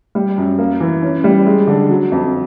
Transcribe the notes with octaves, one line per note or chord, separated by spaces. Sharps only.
G3
F#2
A#3
E3
C#4
G3
G#3
D3
F#3
F2